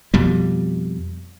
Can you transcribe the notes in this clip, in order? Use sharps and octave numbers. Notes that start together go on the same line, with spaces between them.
F2 B2 G3